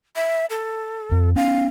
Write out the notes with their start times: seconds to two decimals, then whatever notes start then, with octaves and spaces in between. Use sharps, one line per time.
0.16 E5
0.50 A4
1.11 F2
1.36 B3 C#4 F5